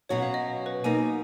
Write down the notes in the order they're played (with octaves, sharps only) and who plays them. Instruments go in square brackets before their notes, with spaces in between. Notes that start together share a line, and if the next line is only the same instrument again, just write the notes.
[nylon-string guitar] B2 F#3 C#4 F#4 [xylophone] C#5
[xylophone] F5
D#5
B4
[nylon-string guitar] B2 A#3 D#4 [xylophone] G#5